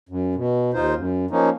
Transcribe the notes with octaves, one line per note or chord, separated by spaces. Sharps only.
F#2
B2
D#2 D#4 F4 C5
F#2
F3 A#3 C#4 D#4